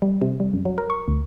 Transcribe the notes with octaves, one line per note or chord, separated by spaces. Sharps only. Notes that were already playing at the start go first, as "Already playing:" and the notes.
G3
C3
G3
F#2
F#3
A#4
C#6
D2